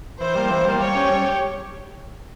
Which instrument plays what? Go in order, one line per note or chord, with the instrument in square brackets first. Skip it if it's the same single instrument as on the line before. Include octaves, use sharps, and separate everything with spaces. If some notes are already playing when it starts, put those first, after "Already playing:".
[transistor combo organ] E3 [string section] C5
[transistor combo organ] G3 A#3
E3
G3 A#3
[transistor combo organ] G3 [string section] C#5
[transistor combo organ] C#4 G4
G3
G4